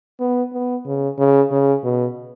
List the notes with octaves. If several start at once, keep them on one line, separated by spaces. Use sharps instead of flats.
B3
B3
C#3
C#3
C#3
B2